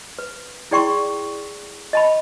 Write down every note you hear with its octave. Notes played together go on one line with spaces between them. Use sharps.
B4
E4 G#4 D5 G5 C6 C#6
D#5 A5 B5